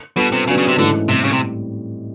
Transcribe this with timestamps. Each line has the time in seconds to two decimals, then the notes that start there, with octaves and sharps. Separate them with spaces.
0.17 B2 G3 B3 D4 F4 A4
0.32 C3
0.47 C#3 F#3 B3 D4 F#4 B4
0.58 C#3
0.68 C3
0.78 G#2 D3 E3 A3 C#4 E4
1.09 A2 C3 E3 G3 C4
1.24 C#3
1.32 C3